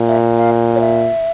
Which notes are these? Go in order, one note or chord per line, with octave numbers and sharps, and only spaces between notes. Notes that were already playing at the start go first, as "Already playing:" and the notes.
Already playing: A#2
E5
F5
C#5
E5